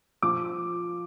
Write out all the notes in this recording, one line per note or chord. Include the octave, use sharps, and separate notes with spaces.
F3 D6